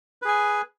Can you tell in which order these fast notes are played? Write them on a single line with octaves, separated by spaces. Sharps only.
B4 G#4 G#5